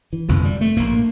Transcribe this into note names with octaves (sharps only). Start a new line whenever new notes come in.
E3
G1 F2 C3 F3
G3
A3
A#1 A2 A#3